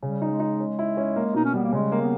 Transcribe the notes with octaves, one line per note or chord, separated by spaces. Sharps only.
C#3 G3
D#4
G#3
D#4
C#4
E4
C#4
A#3
B2 D#4
C#4
G3 B3
A#3
C#3 G#3
A#3
B3